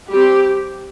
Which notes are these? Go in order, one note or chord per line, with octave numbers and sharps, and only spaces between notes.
G3 C4 G4